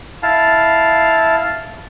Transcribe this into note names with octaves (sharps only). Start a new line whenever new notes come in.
E4 F5 A5